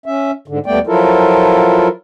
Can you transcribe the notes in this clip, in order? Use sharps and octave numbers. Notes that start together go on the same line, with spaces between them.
C#4 E5
G#2 D3
D#2 G3 A3 B3 D5 G5
F3 F#3 E4 F4 A4 A#4